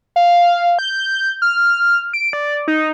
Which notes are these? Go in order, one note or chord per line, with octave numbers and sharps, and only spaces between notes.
F5
G6
F6
D7
D5
D#4